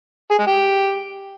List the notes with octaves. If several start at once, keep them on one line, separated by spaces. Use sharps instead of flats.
G#4
G#3
G4